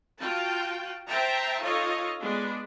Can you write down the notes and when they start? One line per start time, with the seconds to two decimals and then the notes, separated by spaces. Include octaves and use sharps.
0.20 F4 F#4 G5 A5
1.07 C5 E5 G5 A5 A#5
1.61 D#4 F4 A4 C#5 D#5
2.19 G#3 B3 D4